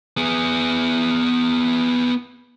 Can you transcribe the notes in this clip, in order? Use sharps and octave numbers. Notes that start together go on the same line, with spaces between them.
B3 G#4